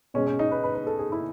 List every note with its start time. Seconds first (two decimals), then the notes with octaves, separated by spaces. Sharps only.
0.14 B2 G#3 C#4
0.27 C#4
0.39 D#4
0.51 B4
0.64 B4
0.75 B4
0.87 A4
0.99 G#4
1.12 E4